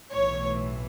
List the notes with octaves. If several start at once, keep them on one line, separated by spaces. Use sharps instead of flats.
B1 A2 E3 C#5